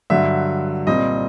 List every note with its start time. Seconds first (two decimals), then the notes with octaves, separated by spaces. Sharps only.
0.10 G2 D3 F#3 E5
0.87 C2 A#2 G3 C4 D#5